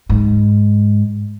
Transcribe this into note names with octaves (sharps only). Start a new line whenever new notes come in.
G#2